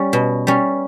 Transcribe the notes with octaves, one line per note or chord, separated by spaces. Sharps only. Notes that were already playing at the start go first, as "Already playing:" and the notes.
Already playing: G3 C#4
B2
G3 C#4